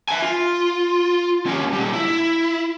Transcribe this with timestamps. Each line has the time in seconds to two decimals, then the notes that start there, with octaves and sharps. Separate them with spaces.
0.08 E5 G#5
0.22 F4
1.46 D#2 C#4
1.73 A#2 G3
1.93 E4